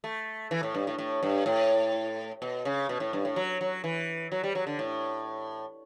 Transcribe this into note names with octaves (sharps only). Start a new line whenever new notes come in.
A3
E3
A2
G2
A2
A2
G2
A2
B2
C#3
B2
A2
G2
A2
F#3
F#3
E3
F#3
G3
F#3
D3
A2